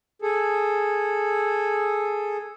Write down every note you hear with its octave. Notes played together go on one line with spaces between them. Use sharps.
G#4 A4